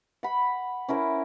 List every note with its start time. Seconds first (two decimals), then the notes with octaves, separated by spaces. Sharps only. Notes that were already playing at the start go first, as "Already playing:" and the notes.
0.23 F#5 B5
0.89 C#4 E4 A#4 C5